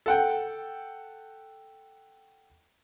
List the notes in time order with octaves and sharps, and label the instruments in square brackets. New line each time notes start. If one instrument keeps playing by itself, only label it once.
[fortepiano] A4 F#5 G5